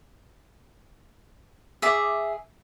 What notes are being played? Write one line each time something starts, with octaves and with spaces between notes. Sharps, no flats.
G#4 E5 D6